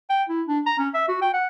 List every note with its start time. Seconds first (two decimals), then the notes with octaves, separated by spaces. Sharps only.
0.10 G5
0.29 E4
0.48 D4
0.66 A#5
0.79 C#4
0.94 E5
1.08 F#4
1.22 G5
1.33 F#5